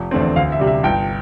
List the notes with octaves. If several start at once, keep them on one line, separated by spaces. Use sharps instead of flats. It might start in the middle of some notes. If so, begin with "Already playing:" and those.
Already playing: F1
E2 D3 A3 C4
D2 F5
E5
C3 G3
E5
G1 G5